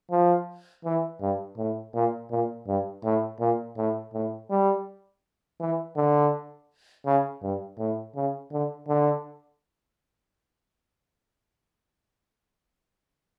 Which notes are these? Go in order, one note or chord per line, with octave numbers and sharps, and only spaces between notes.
F3
E3
G2
A2
A#2
A#2
G2
A2
A#2
A2
A2
G3
E3
D3
C#3
G2
A2
C#3
D3
D3